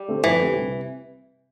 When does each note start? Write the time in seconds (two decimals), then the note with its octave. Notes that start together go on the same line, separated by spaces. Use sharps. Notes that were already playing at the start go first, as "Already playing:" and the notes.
Already playing: G3
0.08 D3 A3 C4 G4
0.24 F2 E3
0.39 D3 A3 C4 G4
0.55 C2
0.69 C3